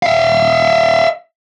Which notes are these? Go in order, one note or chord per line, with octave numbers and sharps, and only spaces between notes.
E5 F5